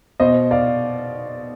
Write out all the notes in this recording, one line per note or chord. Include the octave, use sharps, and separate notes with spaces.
B2 C5 D#5
D5 F5